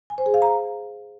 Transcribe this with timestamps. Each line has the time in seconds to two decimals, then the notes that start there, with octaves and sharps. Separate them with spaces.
0.10 G#5
0.18 C5
0.26 G#4
0.34 F5
0.42 A#5